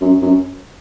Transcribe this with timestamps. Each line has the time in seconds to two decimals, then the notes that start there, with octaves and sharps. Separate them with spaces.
0.01 F#2
0.22 F#2